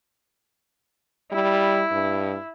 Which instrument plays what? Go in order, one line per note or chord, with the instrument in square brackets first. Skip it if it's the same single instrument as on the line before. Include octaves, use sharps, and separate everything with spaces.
[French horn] G3 [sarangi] E4
[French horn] G2